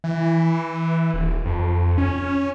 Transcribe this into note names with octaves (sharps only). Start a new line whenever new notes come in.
E3
D#1
F2
C#4